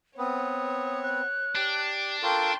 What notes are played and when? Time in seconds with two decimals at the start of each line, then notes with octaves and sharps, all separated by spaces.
0.18 B3 C4 B4 C#5 D#6
1.03 F#6
1.56 D4 G4
2.23 F4 A4 A#4 G5 C6 C#6